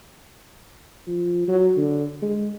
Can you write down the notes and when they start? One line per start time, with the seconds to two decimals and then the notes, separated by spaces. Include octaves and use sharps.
1.08 F3
1.48 F#3
1.77 D3
2.22 G#3